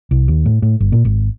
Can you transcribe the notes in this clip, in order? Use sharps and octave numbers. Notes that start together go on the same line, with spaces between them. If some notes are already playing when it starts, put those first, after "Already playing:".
C2
D#2
A2
A2
G1
A#2
G#1